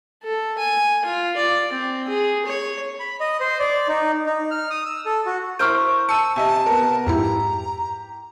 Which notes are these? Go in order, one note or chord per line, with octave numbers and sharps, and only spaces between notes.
A4
G#5
F4
D5
C4
G#4
C#5
B5
D#5
C5
D5
D#4
D#4
F6
D#6
E6
A4
F#4
E4 A#4 C5 C#6 F6 G6 D7
A5 E6 C#7 D#7
C3 D#5 E5 G#5 A5
B3 A#4
F2 G#2 E4 G4 A#5